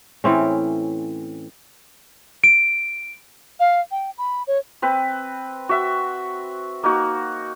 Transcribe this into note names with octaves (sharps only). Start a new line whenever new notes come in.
A2 E3 C4 C#4
D7
F5
G5
B5
C#5
C4 B4
F#4 E5
A#3 D#4 F#4